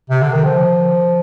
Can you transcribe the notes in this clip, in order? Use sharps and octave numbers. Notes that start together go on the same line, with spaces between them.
C3
D3
D#3
F3